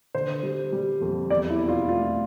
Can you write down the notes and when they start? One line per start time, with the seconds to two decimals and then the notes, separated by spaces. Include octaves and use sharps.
0.15 D3 C5
0.43 G3
0.72 G3
1.01 F2
1.30 E2 D5
1.50 E4
1.60 B2
1.69 F4
1.89 A3 F4